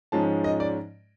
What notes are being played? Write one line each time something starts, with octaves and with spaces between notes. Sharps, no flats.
G#2 F3 G#3 C#4 A5
D#5
D5